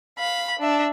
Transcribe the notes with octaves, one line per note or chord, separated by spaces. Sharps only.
F5 B5
D4 E5